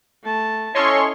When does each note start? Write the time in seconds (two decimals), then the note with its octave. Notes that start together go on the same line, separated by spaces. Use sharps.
0.23 A3 A5
0.75 C#4 E4 A4 C#5 D#5 C6 C#6